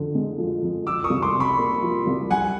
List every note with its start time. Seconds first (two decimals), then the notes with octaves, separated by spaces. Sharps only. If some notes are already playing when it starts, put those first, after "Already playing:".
Already playing: F2 D3
0.15 G#3
0.38 F3
0.62 F2
0.86 F3 D6 E6
1.04 C#6 D#6
1.10 C2
1.22 C6 D6
1.35 C3
1.40 B5 C#6
1.58 A#3
1.82 F3
2.07 C2
2.30 G3 F#5 G#5